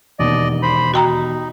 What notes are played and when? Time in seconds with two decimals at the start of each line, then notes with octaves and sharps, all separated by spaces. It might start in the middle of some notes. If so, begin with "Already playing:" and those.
0.19 E1 D#2 B2 D5 D#5
0.63 C5 B5
0.94 D#4 F#4 G5 A#5